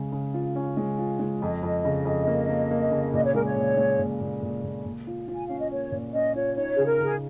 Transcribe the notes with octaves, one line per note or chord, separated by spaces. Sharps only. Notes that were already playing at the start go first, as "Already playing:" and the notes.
Already playing: C#3 G#3
C#3
F4
C#4
G#3
F4
G#3
F2 D#5
F2
C#3
F2
A#3
A#3
A#3
C#3
A#2 D#5
C#5
G#3 A#4
C#5
A#2
G#3
A#2
A#2
A#2
A#2
A#2
F4
F4
G#5
C#4 F5
D#5
A#3 C#5
A#2
C#4 D#5
F4 C#5
D#4 C#5
C#3 G#4
A#4
C#3 G#4